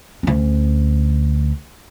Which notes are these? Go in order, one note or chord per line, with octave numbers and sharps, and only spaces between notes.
D2 C#4